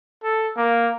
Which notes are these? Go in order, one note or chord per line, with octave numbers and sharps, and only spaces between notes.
A4
A#3